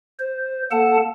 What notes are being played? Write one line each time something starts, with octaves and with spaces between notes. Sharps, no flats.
C5
A#3 A4 F#5 A5